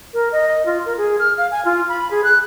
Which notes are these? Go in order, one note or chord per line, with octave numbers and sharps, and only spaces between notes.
A#4
D#5
F4
A#4
G#4
F6
F5
G#5
F4
B5
G#4
F#6